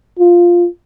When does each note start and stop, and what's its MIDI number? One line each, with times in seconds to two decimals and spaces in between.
0.19 0.67 65